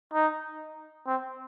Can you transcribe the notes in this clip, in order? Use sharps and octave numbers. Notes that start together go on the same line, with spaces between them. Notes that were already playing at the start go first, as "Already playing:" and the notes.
D#4
C4